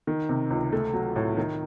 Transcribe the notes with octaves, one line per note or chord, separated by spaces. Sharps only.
D#3
C3
C#2
A3
F#3
A2
D#3